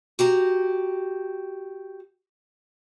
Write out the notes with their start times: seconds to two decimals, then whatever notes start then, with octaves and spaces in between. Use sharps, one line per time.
0.19 F#4 G4 A#5